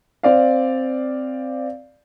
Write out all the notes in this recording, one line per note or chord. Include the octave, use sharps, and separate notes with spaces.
C4 D5 F5